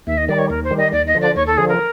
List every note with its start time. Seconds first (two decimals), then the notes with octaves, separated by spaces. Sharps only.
0.07 D#2 E5
0.17 D#5
0.28 D#3 G3 D5
0.39 C#5
0.50 D#2 A#4
0.64 C5
0.71 D#3 G3
0.78 D#5
0.92 D#2 D5
1.07 D#5
1.15 D3 F3
1.21 D5
1.36 D#2 C#5
1.47 A4
1.57 D3 F3 G#4
1.69 A#4